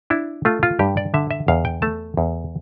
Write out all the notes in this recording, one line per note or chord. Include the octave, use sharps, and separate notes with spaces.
D4 E4
A3 F4
F4
G2 G4
D5
D3 E5
E5
E2 F5
G5
A3 A5
E2